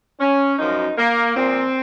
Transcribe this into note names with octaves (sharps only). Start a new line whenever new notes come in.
C#4
F#2 F3 D#4
A#3
A#2 F3 C4